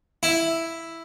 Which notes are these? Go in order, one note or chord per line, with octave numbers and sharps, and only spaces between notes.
E4